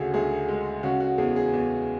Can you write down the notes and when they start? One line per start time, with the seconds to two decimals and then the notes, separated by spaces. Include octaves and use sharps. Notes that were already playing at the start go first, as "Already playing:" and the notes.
Already playing: D2 C#3 F#4 G#4 A4
0.14 D2 G#4
0.48 G#3
0.83 C#3 F#4
1.00 F#4
1.18 E2 G#4
1.36 G#4
1.53 E2